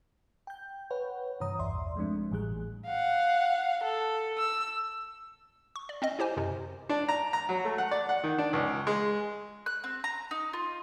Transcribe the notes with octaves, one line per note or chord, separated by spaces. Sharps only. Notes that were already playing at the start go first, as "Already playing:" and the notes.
G5 G6
B4 C#5 F#5
G2 C3 E3 C#5 A#5 D#6
A#1 E2 G2 D5 E5 C6
F3 G#3 A3 C4 D4
A1 A2 E3 G3 G#4 F#6
F5 F#5
A4
E6
C#6
D5
C4 C#4 D#5
E4 G4 C5 G#5
F#2 C3
D4
A#5
A#5
F#3
A3
F#5
D5
F#5
D#3
D4
C#2
G#3
F#6
C4
A#5
D#4
F4